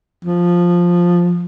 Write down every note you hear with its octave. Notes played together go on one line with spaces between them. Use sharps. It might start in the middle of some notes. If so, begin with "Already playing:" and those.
F3